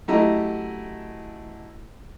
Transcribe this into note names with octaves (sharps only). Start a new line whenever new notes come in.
F#2 A3 E4 G4 D#5 A#5